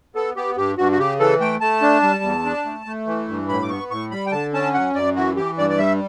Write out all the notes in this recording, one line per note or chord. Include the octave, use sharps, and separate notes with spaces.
B3 A4
B3 G4
G2 G4
G2 F#4
F#4
C#3 G4
E3 A4
A3 G5
A3 A5
D4
G3
E2
D4
A3
A3
E3
G2
A2 B5
D6
B3 C#6
A2 C#6
G3 B5
G5
D3 A5
C#4 A5
F#2 F#5
F#2 D5
E3 F#4
E3 G4
G2 D5
D5
G3 E5